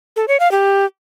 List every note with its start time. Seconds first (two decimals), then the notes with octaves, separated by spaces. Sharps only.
0.16 A4
0.28 C#5
0.40 F5
0.52 G4